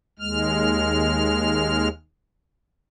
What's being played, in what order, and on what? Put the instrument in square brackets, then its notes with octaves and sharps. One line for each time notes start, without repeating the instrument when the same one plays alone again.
[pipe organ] D#2 G#3 F6